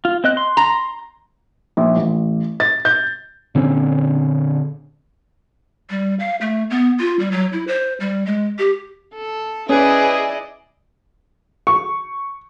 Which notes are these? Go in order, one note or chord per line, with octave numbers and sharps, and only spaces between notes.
F4
C4 D#5 F#6
C6
A#5
A#1
A1
A6
G6
A#2 D3 C4 C#4
G3
F5
A3
B3
F4
G3
F#3
E4
C5
G3
G#3
G4
A4
C#4 E4 G#4 B4 D5 D#5 D#6
C#6